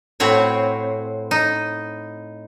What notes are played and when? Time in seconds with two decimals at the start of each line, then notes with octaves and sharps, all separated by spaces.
0.20 A2 C4 F#4 C#5
1.31 D#4